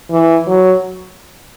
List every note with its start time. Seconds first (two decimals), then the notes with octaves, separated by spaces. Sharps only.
0.11 E3
0.47 F#3